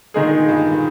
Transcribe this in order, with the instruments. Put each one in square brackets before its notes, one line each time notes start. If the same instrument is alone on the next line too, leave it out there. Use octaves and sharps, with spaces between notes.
[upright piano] A#2 D3 [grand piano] D#3 G#3 D#4 G#4
[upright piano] G2 A#2